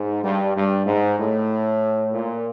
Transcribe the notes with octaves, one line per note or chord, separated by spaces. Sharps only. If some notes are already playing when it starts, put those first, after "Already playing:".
Already playing: G#2
G2
G2
G#2
A2
A#2